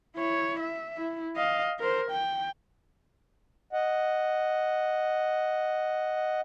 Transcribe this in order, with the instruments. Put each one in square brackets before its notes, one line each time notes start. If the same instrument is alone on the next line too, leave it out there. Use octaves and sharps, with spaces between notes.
[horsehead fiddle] E4 C#5
E5
E4
D#5 F5
A#4 C5
G5
[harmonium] D#5 F#5